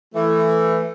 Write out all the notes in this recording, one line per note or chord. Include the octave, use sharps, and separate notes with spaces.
E3 A3